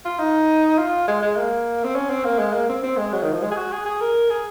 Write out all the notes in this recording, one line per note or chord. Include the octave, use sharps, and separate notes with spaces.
F4
D#4
F4
G#3
G#3
A#3
C4
C#4
C4
A#3
G#3
A#3
C4
C4
G#3
F#3
D#3
F3
G#3
G#4
F#4
G#4
G#4
A#4
G#4